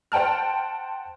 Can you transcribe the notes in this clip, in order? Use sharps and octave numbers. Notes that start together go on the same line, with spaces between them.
C5 F#5 G5 A5 F6